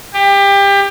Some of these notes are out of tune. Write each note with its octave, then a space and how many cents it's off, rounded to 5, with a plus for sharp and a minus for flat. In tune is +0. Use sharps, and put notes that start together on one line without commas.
G4 +25